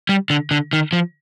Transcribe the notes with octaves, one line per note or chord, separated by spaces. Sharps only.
G3
D3
D3
D#3
F3